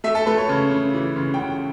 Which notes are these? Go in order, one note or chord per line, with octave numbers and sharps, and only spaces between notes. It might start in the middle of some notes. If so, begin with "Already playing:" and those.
A3 E5
A4
A3 B4
C#5
C#3
C#3
E3
C#3
G5
C#3 F#5